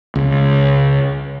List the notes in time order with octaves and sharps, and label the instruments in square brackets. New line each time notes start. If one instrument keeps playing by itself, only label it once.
[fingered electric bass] C#2